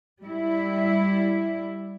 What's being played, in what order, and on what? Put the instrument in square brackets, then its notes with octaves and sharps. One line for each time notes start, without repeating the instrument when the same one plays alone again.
[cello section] G3 E4